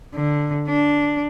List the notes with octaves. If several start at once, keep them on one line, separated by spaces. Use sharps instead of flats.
D3
D4